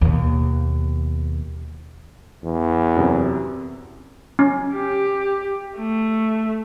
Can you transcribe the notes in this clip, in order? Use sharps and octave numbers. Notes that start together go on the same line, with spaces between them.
D#2 B2
E2
F#2 C3
C#4
G4
A3